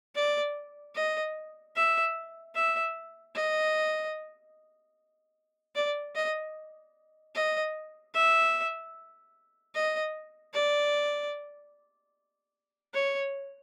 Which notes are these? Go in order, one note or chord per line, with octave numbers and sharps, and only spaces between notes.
D5
D#5
E5
E5
D#5
D5
D#5
D#5
E5
D#5
D5
C#5